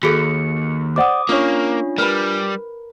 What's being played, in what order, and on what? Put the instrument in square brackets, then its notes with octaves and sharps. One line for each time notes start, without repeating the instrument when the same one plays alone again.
[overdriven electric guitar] D#2 [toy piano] F#4 G#4 A4 [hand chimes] C#7
[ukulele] C5 D5 F#5 [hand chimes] D6 D#6
[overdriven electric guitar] A#3 [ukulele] C#4 C#5 [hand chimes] D4 F4
[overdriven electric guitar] G3 [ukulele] A#4 B4 B5